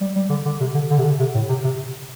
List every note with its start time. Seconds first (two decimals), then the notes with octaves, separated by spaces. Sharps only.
0.01 G3
0.15 G3
0.30 D3
0.45 D3
0.61 C3
0.75 D3
0.90 D3
0.99 C3
1.05 D3
1.20 C3
1.35 A2
1.49 C3
1.64 C3